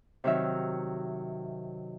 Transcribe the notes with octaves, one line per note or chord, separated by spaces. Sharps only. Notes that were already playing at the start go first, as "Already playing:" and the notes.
C3 D#3 F#3 E5